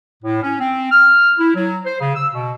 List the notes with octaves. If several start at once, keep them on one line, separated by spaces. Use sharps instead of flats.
A2
C#4
C4
F6
E4
F#3
C5
C#3
E6
B2